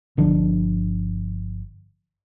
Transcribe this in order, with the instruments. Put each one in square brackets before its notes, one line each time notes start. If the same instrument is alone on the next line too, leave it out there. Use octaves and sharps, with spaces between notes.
[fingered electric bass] G1 D3 F3 D4